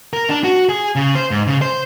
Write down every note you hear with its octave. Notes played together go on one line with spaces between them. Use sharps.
A#4
D4
F#4
G#4
C#3
C5
G#2
C#3
C5